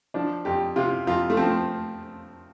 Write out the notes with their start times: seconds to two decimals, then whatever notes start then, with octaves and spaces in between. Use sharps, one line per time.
0.14 F3 D4
0.45 F2 G4
0.76 C3 F4
1.07 F2 F4
1.30 A3
1.37 F3 C4